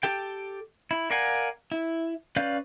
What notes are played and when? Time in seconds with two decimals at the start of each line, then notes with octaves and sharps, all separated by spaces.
0.03 G4 A4 G5
0.91 E4
1.10 A#4 D5 F5 F#5 G#5
1.72 E4
2.36 C#4 B4 D5 F5 G6